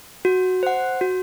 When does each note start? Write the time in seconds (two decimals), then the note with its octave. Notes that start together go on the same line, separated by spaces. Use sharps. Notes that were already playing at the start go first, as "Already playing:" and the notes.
0.25 F#4
0.63 C5 F#5
1.01 F#4